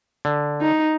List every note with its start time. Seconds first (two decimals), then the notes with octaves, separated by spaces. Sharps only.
0.25 D3
0.61 D#4